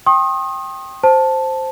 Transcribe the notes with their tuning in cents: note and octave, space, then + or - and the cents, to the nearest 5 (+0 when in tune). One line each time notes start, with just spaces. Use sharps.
G5 +0 C6 +45 D#6 +0
C5 +0 A5 +0